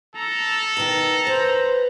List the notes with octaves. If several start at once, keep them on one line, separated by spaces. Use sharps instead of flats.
A4 A#5
B2 D#3 A#5
B4 C5